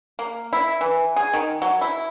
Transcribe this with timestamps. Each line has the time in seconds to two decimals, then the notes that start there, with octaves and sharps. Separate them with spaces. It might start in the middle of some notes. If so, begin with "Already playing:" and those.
0.19 A#3
0.53 E4
0.81 E3
1.16 G#4
1.34 D#3
1.62 F#3
1.81 E4